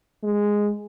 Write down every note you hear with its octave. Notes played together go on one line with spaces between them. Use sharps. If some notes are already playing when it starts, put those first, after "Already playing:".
G#3